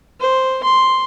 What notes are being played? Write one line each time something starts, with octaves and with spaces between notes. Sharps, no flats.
C5
C6